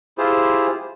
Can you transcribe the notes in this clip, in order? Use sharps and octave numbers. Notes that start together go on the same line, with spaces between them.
E4 F4 G4 G#4 C5